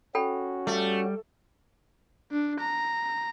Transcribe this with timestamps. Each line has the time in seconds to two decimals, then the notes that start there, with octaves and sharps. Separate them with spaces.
0.15 C#4 F#4 A4 G5 B5
0.67 G3 A3
2.32 D4
2.60 A#5